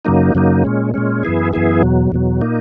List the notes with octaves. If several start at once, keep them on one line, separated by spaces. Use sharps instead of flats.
F#2 C#3 F#3 A#3 D#4
F#2 C#3 F#3 A#3 D#4
A#2 G#3 C#4
A#2 G#3 C#4
F#2 E3 B3 E4 G#4
F#2 E3 B3 E4 G#4
E2 B2 F#3
E2 B2 F#3
A#2 A#3 D#4